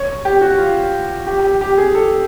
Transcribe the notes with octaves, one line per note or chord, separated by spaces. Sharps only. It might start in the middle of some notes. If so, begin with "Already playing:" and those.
Already playing: C#5
G4
F#4
F4
G4
G4
G4
G#4
A4